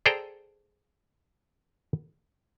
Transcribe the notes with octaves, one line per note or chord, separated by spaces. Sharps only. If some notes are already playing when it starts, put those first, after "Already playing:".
G#4 A4 C5 D5 G5 A#5